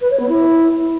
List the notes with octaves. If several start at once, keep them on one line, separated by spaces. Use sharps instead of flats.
B4
C#5
B3
E4